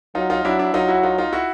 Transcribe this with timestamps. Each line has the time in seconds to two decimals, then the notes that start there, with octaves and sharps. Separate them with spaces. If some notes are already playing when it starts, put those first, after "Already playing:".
0.15 F#3 D#4 F4
0.30 D#4 F4
0.44 F#3 D4 E4
0.59 D4 E4
0.74 F#3 D#4 F4
0.88 E4 F#4
1.03 D#4 F4
1.18 D#4 F4
1.33 E4 F#4